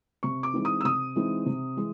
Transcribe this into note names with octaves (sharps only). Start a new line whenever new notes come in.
C3 C#6
D6
E3 G#3 C4 D#4
D#6
E6
C3 D#6
E3 G#3 C4 D#4
C3
E3 G#3